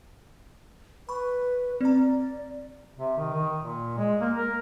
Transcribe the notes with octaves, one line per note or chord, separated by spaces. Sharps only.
B4 B5 C#6
C4 D5 A#5
C3
D#3
D#3
A#2
G#3
A#3
A#4